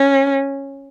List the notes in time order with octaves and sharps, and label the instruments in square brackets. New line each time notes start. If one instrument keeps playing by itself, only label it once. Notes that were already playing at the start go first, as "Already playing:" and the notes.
Already playing: [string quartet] C#4